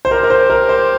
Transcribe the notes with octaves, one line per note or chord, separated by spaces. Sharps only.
C5
G4 A#4
A#4
C5
A#4
C5